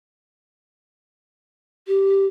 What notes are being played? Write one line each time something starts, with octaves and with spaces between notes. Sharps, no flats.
G4